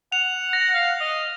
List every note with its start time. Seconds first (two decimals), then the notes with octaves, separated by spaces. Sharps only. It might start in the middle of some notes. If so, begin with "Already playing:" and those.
0.12 F#5 F7
0.53 A#6
0.74 F5
1.01 D#5